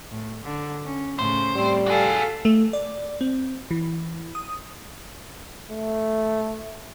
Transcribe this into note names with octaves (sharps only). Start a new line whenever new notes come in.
A2
D3
C#4
A2 C#3 C5
A2 G3 C4
F#4 G#4 A4 F5
A3
D5
C4
E3
D#6
A3